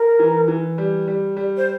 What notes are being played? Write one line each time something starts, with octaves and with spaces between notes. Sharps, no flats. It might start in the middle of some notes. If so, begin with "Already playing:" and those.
Already playing: A#4
E3
E3
G3
G3
G3
C5